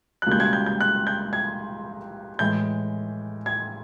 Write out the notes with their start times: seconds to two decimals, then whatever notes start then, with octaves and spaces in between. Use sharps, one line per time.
0.22 F#6
0.27 C#2 B2 G3 A#3 G6
0.40 G#6
0.53 G6
0.66 G6
0.81 F#6
1.07 G6
1.33 G#6
2.39 A2 E3 G#3 G6
3.46 G#6